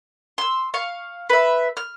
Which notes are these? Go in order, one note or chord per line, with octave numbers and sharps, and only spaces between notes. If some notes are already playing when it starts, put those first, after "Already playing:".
C6 E6
F5 C#6
B4 E5
F6